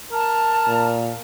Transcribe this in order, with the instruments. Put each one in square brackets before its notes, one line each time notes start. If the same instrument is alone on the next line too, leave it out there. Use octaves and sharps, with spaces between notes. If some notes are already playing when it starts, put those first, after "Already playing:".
[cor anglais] A#4 [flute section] A5
[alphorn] A#2